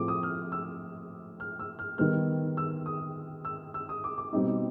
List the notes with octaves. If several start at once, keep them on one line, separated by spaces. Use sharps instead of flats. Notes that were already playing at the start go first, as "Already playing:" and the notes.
Already playing: A2 F3 A3 C4 D6
D#6
F6
E6
F6
E6
F6
D#3 G3 B3 F6
E6
D#6
E6
E6
D#6
D6
D6
B2 G3 C4 D#4